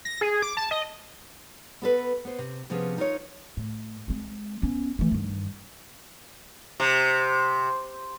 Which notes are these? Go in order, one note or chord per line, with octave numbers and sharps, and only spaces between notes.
A#6
G#4
D6
A5
D#5
B3 A4 B4
B3 C5
C3
C3 F3 B3 C#4 G#4
D#4 F4 A#4 C5 C#5
A2
G#3 C4
B3 C#4
E3 A3
G2 D#3
C3